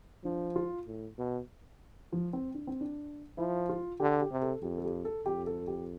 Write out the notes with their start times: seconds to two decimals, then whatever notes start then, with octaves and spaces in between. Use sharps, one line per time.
0.24 F3 D4
0.56 F4
0.87 A2
1.18 B2
2.12 F3
2.33 C4
2.54 D4
2.67 C4
2.81 D4
3.38 F3 E4
3.69 F4
4.00 D3 G4
4.21 G4
4.31 C3
4.42 A4
4.63 F2 G4
4.78 A4
4.84 G4
5.05 A4
5.26 F2 G4
5.47 A4
5.68 G4